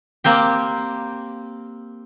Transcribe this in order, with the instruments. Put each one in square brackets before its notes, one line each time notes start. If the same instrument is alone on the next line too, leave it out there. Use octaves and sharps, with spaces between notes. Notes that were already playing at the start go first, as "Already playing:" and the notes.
[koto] A#3 C4 G4